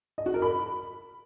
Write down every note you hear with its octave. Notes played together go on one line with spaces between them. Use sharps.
D#5
F#4
A#4
B5